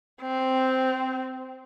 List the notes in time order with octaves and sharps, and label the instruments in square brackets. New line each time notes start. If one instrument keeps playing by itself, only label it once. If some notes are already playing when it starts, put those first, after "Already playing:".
[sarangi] C4